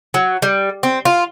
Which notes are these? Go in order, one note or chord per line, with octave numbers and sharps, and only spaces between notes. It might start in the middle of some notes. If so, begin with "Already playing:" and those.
F#3
G3
C4
F4